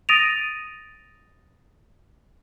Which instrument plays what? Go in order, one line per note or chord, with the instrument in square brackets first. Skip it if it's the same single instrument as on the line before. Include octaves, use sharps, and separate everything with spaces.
[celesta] D#6 A6 A#6 D7 D#7 F7